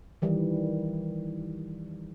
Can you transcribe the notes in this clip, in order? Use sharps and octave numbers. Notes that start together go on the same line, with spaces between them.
D#3 E3 G3